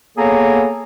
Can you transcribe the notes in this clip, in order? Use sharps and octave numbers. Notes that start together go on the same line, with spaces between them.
A#3 B3 G#4 A4 C#5 A#5